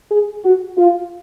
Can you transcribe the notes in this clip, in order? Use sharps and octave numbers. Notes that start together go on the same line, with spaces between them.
G#4
F#4
F4